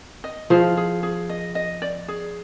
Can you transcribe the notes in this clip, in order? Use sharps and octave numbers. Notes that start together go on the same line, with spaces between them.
D#5
F3 G#4
G#4
G#4
D#5
D#5
D5
G#4